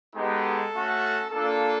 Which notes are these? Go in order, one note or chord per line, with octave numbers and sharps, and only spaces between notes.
G#3 B3 D#4 G4 A4
A3 C#4 F#4
A#3 D4 F4 A4